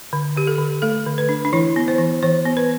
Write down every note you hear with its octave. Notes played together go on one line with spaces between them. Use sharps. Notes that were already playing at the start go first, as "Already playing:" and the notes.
D3
D3 G4
A4
D3
A3 A4
D3
B4
D4
D4
E3 E4
B3
C5
E3
E3 C5
B3
B4